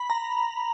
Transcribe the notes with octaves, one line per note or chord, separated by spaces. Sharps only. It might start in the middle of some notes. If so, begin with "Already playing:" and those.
Already playing: B5
A#5